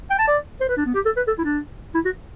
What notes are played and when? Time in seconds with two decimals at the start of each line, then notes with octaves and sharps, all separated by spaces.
0.10 G5
0.19 A5
0.27 D5
0.61 C5
0.69 B4
0.77 D4
0.85 B3
0.94 G4
1.05 A4
1.16 B4
1.27 A4
1.38 E4
1.44 D4
1.94 E4
2.05 F#4